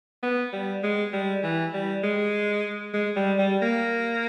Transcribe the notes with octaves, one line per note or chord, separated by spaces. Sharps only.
B3
G3
G#3
G3
E3
G3
G#3
G#3
G3
G3
A#3